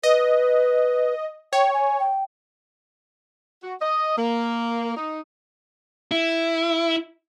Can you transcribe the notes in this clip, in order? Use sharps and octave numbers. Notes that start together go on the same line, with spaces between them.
B4 D#5
C#5 G5
G#5
G5
F#4
D#5
A#3
D#4
E4